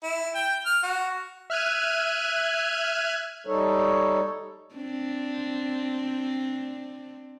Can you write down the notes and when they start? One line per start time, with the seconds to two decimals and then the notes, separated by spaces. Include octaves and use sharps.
0.03 E4
0.35 G5
0.66 F6
0.83 F#4
1.50 E5 F6 F#6 G#6 D#7
3.47 G3 D#4 A4 C#5
4.75 C4 D4